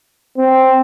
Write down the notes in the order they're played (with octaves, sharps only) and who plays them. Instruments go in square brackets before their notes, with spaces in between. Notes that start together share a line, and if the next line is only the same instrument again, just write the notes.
[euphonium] C4